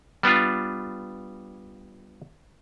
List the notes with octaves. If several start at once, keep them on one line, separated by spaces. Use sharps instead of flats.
G3 B3 D4 F4